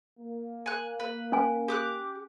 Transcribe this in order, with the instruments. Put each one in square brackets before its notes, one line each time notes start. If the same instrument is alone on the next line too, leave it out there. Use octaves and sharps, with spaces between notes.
[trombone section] A#3
[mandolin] G#5 F#6
B4
[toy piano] C#4 G#5
[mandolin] G4 D6 F#6